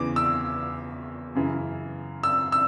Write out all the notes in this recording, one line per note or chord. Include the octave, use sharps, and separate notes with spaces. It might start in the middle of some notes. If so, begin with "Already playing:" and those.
Already playing: E2 C#3 E3 D6
E6
F#2 C#3 E3
E6
E6